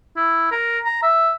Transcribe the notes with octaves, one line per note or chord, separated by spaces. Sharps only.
E4
A#4
A#5
E5